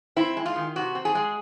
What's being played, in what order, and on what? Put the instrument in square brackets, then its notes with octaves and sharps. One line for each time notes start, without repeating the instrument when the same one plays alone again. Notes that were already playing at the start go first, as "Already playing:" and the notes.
[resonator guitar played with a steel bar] C4 E4
G#3
F4
D#3
C3 F#4
C4
G#4
G#3